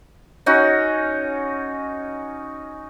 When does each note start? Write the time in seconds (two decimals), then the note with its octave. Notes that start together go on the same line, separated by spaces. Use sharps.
0.46 C#4 D#4 F#4